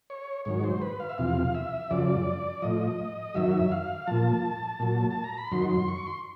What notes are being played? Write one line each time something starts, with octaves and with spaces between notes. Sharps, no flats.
C#5
G#2 D#3 F#3 C#5
C5
B4
F5
E5
E2 C3 F3 F5
E5
F#2 C#3 F3 D5
A2 F3 D#5
F#2 D#3 F#3 E5
F5
A#2 F3 A5
A#2 F#3
A5
A#5
B5
F#2 D#3 F#3 C6
C6
C#6
C6